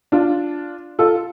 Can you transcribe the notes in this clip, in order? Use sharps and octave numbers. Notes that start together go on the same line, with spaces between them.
D4 F4
F4 A4